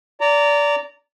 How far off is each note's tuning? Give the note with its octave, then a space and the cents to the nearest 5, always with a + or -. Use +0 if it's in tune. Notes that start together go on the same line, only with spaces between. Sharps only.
D5 -20 A#5 -20